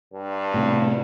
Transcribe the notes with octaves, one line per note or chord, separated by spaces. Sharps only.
G2
A2 C3